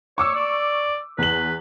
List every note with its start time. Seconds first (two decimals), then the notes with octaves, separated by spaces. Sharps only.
0.18 C#5 C#6 D6 E6
0.35 D5
1.18 E2 B4 F#7